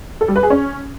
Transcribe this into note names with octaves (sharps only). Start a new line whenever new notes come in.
A4
G3
B4
G#4
C#4